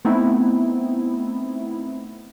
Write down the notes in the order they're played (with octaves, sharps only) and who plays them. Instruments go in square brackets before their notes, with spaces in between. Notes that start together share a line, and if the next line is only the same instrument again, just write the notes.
[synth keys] A3 B3 C4 D#4 E4